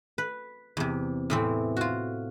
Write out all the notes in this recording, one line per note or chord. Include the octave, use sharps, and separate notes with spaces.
B4
E2 C3
A2 E3 C4
F4 F#4